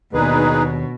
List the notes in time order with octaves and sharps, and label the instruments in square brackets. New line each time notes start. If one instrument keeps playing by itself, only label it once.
[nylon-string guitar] D#2 D4 [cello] B2 [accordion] D#4 G#4 B4